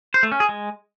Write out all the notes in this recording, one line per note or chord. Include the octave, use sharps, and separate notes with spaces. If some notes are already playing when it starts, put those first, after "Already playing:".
C5
A3
C#4
G#4
G#3